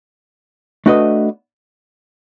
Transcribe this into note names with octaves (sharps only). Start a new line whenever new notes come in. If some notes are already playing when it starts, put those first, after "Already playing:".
A3 D4 F#4 B4 D#5